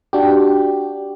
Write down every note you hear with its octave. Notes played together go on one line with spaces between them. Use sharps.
D4 F#4 G4